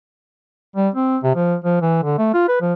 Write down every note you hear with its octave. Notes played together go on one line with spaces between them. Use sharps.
G3
C4
C3
F3
F3
E3
D3
A3
F4
B4
F3